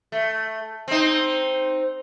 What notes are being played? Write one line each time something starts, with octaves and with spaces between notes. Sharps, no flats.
A3
C4 D#4